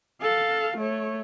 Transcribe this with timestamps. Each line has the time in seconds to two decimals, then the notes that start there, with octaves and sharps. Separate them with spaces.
0.22 A4 F5
0.78 A3 C#5